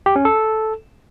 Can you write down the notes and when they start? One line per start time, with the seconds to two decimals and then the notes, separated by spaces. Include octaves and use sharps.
0.06 G4
0.16 C#4
0.25 A4